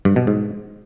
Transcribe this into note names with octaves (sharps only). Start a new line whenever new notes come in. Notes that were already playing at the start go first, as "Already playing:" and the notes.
G2
B2
G#2